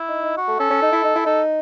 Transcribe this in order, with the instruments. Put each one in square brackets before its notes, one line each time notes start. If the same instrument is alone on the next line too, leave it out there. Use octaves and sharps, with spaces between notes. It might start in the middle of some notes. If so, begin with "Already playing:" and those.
Already playing: [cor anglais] E4
[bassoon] D#4
D#4
[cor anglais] F#4
[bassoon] A3
[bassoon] C#4 [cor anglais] A4
[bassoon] C#4
D#4
E4
D#4
E4
[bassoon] D#4 [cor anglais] A4